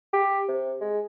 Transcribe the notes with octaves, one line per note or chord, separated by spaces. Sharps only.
G4
C3
G#3